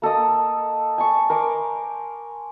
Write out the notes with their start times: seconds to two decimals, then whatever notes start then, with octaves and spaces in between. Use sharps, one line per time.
0.02 A#3 A4 D#5 D#6
0.98 G#5 A5 C#6
1.30 A#4 C5 G#5 D6